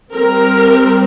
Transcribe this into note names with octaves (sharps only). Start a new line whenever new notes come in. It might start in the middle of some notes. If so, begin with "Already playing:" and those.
G3 C4 A#4